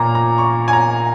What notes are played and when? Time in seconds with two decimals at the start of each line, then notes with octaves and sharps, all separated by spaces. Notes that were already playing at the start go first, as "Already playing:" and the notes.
Already playing: A#2 A#3 A#5
0.15 A#5
0.38 C#6
0.68 G#5
0.73 A#5